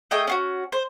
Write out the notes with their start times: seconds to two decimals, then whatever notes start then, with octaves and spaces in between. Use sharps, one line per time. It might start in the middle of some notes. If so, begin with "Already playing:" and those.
0.11 A3 G#4 D#5 G5
0.27 C#4 F4 F#4
0.72 C5